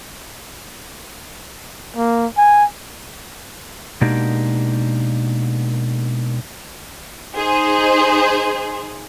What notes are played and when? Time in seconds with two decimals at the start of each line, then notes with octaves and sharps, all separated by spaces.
1.96 A#3
2.37 G#5
4.01 B2 G#3 A#3 D4 D#4 G4
7.35 D#4 G#4 C5